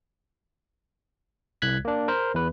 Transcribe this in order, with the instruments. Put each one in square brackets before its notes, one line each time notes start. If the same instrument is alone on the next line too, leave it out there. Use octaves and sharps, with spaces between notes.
[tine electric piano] C2 F#6 G#6 B6
A#3 D4
A#4 C5
E2 B4